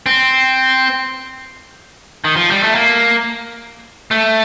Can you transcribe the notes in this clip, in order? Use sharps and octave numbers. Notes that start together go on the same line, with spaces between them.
C4
D#3
F3
G3
A3
A#3
A3